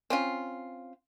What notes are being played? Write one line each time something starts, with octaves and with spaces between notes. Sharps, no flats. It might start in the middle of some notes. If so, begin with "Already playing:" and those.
C4 C#4 F4